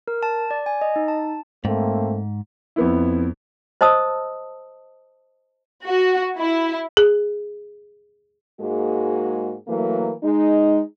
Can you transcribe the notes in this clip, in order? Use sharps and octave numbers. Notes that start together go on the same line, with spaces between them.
A#4
A5
D5
G#5
D#5
D#4
A5
G#2 A3 A#3 C4
F2 B3 E4
C5 D#5 A5 D#6 E6
F#4
E4
G#4
G#2 G#3 A#3 F#4 G#4
E3 F#3 A3 A#3 A#4
G#3 D#4